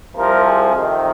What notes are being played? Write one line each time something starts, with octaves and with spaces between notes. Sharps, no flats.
C2 C3 F3 A#4
G#4
F2 C3 D#3